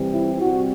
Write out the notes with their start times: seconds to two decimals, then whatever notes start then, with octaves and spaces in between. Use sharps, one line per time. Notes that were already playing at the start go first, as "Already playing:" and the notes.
Already playing: C3 E3 G3 C4
0.11 E4
0.40 C3 G3 C4 F#4